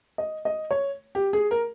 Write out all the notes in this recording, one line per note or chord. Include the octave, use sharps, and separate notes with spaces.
D#5
D#5
C#5
G4
G#4
A#4